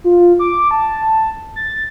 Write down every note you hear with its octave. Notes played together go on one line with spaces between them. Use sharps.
F4
D6
A5
A6